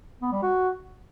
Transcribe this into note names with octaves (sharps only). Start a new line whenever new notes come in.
B3
G3
F#4